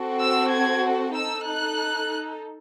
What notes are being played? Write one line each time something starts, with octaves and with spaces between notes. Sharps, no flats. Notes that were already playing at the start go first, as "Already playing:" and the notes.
Already playing: C4 F#4 A4
E6
G#6
D#4 A4 E6
F#6